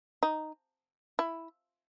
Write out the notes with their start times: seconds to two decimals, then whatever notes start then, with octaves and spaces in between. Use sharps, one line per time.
0.23 D#4
1.19 E4